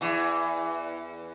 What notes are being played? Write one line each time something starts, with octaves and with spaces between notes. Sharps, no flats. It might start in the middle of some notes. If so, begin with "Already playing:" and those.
E2 E3